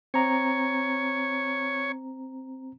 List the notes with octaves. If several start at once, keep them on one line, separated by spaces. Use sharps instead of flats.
C4 C#5 A#5